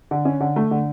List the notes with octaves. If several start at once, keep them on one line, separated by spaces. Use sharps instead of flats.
D3
C#4
D3
A3
D3